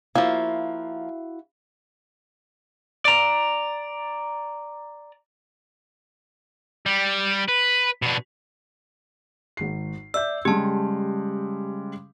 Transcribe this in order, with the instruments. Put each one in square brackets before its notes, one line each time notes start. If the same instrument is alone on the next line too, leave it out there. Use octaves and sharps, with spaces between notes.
[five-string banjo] F3 A#3 [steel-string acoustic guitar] E4 F#4 F5
[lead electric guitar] D5 A#5
[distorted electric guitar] G3
B4
B2 D4
[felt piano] G#1 C7
[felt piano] D5 E5 G6 [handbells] E6
[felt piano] C#3 G3 G#3 [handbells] G4 A5